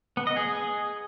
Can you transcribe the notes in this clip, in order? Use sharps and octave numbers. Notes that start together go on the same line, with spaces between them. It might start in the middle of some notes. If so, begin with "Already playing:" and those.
B3
D#5
G#4